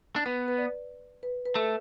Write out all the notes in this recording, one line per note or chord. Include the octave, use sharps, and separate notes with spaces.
D4
B3 B4
B4
D5
B4
B4
A3 A4